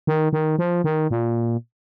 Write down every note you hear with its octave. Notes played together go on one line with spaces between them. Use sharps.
D#3
D#3
F3
D#3
A#2